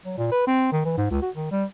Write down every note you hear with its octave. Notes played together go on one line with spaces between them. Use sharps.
F#3
A#2
B4
C4
D#3
E3
G#2
C#2
F#4
D#3
G3